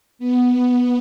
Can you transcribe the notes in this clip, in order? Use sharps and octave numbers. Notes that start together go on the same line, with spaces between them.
B3
B3